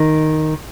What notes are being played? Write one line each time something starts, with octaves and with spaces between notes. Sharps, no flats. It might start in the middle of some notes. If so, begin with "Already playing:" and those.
Already playing: D#3